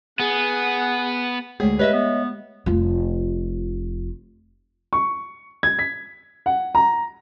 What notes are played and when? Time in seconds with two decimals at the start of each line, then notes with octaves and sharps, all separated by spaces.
0.20 B3 G#4 F#5
1.60 D2 G#3 A3 G#4 C#5
1.79 G4 B4 C#5 D#5 E5
1.93 B3
2.66 F1 F4
4.93 C#6
5.63 G#6
5.79 B6
6.46 F#5
6.75 A#5